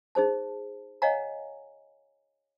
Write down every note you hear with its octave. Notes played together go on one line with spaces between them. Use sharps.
D#4 G#4 C5 A5
C#5 D#5 F5 F#5 G#5 A#5